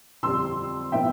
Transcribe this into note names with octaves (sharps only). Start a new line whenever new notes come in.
F2 D3 G3 D4 C6 E6
A2 F3 B3 E4 E5 G5